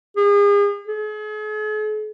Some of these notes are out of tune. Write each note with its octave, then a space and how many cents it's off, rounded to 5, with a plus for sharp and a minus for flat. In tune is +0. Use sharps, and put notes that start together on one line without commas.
G#4 -40
G#4 +45